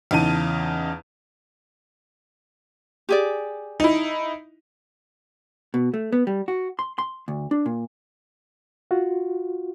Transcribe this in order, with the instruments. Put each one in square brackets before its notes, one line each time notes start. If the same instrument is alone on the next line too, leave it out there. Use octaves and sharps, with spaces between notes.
[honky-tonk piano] E2 C#3 D#4 A5 D#7
[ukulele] G4 G#4 D5
[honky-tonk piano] D#4 E4
[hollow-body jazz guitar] B2
A3
B3
G3
F#4
C6
C6
D2
D4
A#2
[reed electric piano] F4 F#4